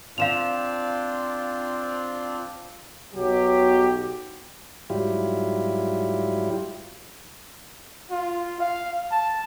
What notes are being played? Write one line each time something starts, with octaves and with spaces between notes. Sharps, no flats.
C4 D4 F4 F5 E7 F7
B1 B2 F#3 G4
G#2 F#3 G3 E4 F4 G4
F4
F5
A5